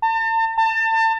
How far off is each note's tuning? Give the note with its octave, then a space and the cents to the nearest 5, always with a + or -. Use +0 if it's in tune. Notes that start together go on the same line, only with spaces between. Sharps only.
A5 +40
A5 +30